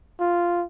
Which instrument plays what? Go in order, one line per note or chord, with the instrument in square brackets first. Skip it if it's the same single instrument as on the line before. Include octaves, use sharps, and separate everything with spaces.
[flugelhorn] F4